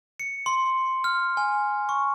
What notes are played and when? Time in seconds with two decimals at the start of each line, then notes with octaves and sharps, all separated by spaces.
0.20 C#7
0.46 C6
1.04 F6
1.37 G#5
1.89 C#6